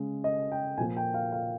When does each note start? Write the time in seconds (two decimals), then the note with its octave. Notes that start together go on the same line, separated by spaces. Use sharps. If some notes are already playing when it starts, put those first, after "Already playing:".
Already playing: C#3 G#3
0.24 D#5
0.52 G5
0.78 A#2 F3 A#3 G#5
0.97 G5
1.14 F5
1.32 F5